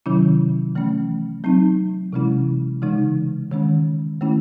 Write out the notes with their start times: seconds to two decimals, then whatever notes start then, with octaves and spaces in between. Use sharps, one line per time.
0.06 C3 D#3 F#3 C#4 E4
0.75 E3 A3 C#4
1.44 F#3 C4 D#4
2.13 C3 E3 G#3 C#4 E4
2.82 C#3 E3 G#3 D#4
3.51 D#3 G#3 C#4
4.21 D#3 A3 C#4 E4